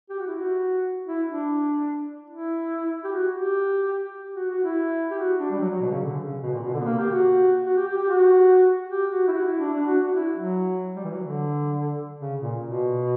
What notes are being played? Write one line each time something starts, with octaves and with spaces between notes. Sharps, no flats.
G4
F#4
E4
F#4
E4
D4
E4
G4
F#4
G4
F#4
F#4
E4
G4
F#4
D4
G3
F#3
F#3
B2
C#3
D3
C#3
B2
A#2
B2
D3
B3
A#3
G4
F#4
F#4
G4
G4
G4
F#4
G4
F#4
E4
F#4
E4
D4
D4
F#4
F#4
E4
F#3
G3
E3
F#3
D3
C#3
A#2
B2